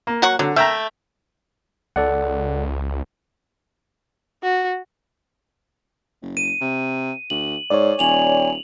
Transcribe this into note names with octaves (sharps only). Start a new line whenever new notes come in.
A#3
F#3 F#5 C#6
D3 F#3
A3 E5 G5 A#5
C#2 A4 D5 F#5
F#4
F#1
D#7
C3
D2 F#7
G#2 C#5 D5
D#1 G#5 F7 F#7